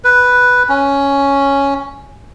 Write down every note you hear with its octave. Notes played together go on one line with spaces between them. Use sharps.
B4
C#4